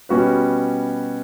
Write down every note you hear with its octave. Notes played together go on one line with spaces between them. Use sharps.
B2 G3 C#4 F#4 B4